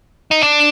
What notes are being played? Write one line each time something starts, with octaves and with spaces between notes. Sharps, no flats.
D#4
D4